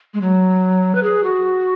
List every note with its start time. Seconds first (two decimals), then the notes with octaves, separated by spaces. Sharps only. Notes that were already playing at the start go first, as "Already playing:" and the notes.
0.14 G#3
0.21 F#3
0.95 B4
1.03 G#4
1.24 F#4